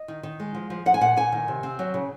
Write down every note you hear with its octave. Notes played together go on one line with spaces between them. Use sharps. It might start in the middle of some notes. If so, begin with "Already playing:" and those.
Already playing: D#5
D#3
D#3
G#3
F3
F3
F3 F#5
G#5
A#2 F#5
A#2 G#5
D#3
C3
C4
F#3
C#3